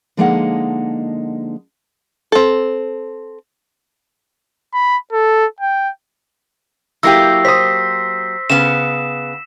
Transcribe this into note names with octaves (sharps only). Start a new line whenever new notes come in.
D3 F3 G#3 A#3 D#4 F#5
C4 A4
B5
A4
G5
F#3 A#3 E4 G4 E6 A#6 C7
C5 D#6 B6
C#3 B3 E7